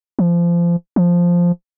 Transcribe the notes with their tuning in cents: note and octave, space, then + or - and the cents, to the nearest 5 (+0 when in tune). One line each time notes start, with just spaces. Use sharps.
F3 -25
F3 +0